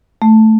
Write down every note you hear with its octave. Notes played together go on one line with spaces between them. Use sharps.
A3